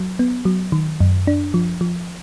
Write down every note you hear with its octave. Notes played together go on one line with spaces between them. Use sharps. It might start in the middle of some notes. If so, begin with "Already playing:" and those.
Already playing: F#3
B3
F#3
D#3
F#2
D4
F3
F3